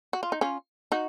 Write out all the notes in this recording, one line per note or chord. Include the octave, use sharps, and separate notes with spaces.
F#4
F4
D#4
C#4 F4
D#4 F#4